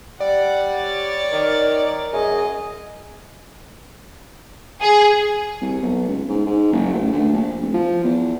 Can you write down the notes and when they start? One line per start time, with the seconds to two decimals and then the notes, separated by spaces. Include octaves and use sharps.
0.20 G3 D5 F#5
0.80 C#5 A6
1.33 D#3 A#4
2.13 F#2 G#4 D#5
4.82 G#4
5.61 C2
5.82 B1
6.08 C#2
6.29 G#2
6.46 G#2
6.72 F#1
6.94 A1
7.12 D2
7.33 A#1
7.61 F1
7.74 F3
8.04 E2